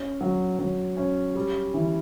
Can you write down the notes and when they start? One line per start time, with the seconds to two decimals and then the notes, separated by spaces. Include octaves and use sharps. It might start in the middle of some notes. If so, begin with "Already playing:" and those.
Already playing: C#4
0.21 F#3
0.59 F#3
0.97 C#4
1.36 G3
1.74 E3